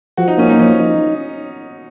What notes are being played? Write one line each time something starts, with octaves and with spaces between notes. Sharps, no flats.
F3 F#4
D#4
A#3 C#4
D#4
F3 C#4
D#4